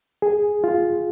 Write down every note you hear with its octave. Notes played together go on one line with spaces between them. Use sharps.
G#4
F4